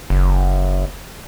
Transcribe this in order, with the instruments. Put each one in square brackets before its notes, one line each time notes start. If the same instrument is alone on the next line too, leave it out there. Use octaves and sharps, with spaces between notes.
[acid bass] F#1